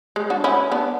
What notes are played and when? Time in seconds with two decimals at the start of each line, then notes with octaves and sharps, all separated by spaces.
0.16 G#3
0.30 D4 F#4
0.44 C#4 E4
0.72 B3 D4